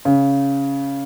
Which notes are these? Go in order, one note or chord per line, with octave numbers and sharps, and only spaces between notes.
C#3